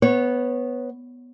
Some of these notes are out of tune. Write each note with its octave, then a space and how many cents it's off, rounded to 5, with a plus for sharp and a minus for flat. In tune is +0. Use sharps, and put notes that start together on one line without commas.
B3 +0 C#5 -20